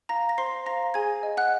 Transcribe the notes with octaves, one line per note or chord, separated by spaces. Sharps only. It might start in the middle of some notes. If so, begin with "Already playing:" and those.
F5 A#5 A#6
A#6
C5 C6 C7
F5 A#5 A#6
G#4 G#5 G#6
D#5
F#5 F#6